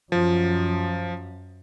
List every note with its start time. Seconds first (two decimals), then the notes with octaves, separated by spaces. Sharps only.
0.12 F#2 F3